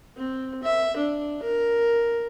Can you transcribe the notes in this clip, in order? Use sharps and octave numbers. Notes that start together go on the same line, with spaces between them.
C4
E5
D4
A#4